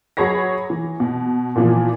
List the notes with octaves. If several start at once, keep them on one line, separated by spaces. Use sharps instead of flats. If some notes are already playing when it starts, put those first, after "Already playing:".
F#3 G#4 C#5 B5 A#6
E3
B2
A#2 E3 F3